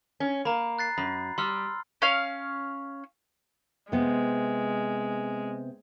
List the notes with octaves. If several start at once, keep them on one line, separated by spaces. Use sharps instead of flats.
C#4
A#3 A#5 B5
F#6 A6 C7
F#2 B5
G3 C6 E6 F6
C#4 F5
C3 G#3 B3